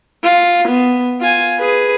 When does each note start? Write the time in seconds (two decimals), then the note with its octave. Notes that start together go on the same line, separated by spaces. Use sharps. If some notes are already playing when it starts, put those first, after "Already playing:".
0.24 F4
0.68 B3
1.21 F4 G#5
1.59 G#4 B4